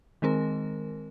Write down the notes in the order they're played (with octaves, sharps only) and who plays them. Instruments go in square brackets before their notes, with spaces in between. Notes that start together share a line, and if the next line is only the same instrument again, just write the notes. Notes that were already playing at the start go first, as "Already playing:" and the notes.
[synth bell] D#3 G#3 C4 A#4